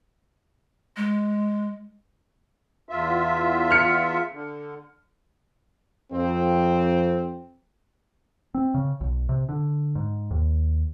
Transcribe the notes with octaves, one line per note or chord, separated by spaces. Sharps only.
G#3
E2 F4 E5
F6 C#7
D3
F2 C4
C4
C#3
B1
C3
D3
G#2
D#2